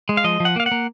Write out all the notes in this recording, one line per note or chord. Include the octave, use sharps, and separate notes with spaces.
G#3
F5
F3 D#5
F3
F#5
A#3 F5
F#5
A#3